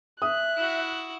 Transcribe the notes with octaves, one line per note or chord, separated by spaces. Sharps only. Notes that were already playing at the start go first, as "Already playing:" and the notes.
E5 D#6 F#6
E4 F#4